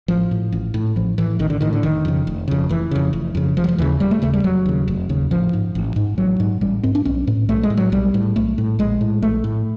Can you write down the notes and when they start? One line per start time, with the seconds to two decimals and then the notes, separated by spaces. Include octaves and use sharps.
0.08 A1 F3
0.31 A2
0.52 A1
0.74 A2
0.96 A1 F3
1.18 A2 E3
1.39 A1 D#3
1.50 D3
1.61 A2 D#3
1.73 D3
1.83 F1 D#3
2.05 F2 C#3
2.27 F1
2.48 F2 C#3
2.69 F1 E3
2.91 F2 C#3
3.13 F1
3.35 F2 C#3
3.57 F1 F3
3.64 F#3
3.69 F3
3.78 D#2 C#3 E3
4.00 F1 G3
4.11 A3
4.22 D#2 C#3 A3
4.33 G3
4.44 F1 F#3
4.66 D#2 C#3
4.88 F1
5.09 D#2 C#3
5.31 A1 F3
5.53 G#2
5.75 A1
5.96 G#2
6.18 A1 F#3
6.40 G#2
6.61 A1 G3
6.83 G#2 C4
6.95 D4
7.05 B1 C#4
7.27 A2
7.49 B1 A3
7.63 G#3
7.70 A2
7.77 F#3
7.92 B1 G3
8.14 A2
8.36 B1 A3
8.58 A2
8.79 A#1 G#3
9.01 A2
9.22 A#1 A3
9.44 A2